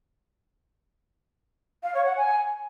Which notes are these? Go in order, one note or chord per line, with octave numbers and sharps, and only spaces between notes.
F5
C#5
F#5
G#5